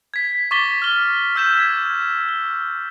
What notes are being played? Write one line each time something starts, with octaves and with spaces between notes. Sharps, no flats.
G#6 B6
C#6 D6 A6 B6 G7
F6 G7
E6 F6 G6 B6 E7
G#6
G7